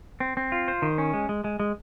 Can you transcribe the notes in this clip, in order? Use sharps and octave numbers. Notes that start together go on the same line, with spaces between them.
C4
C4
F4
C5
D#3
C#4
G#3
G#3
G#3
G#3